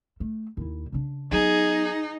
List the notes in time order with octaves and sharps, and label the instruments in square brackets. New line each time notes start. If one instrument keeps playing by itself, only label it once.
[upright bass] A3
D#2 E4
C#3 D4
[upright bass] F#3 B3 [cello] D#4 [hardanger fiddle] G#4